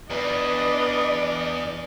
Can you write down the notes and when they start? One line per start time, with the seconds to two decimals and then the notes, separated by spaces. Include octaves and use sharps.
0.10 E2 D4 B4 D5 D#5